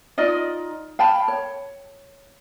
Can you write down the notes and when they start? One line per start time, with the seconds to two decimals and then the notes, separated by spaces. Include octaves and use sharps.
0.18 D#4 F4 D5 D#5
0.99 F5 G5 A5 B5
1.28 C#5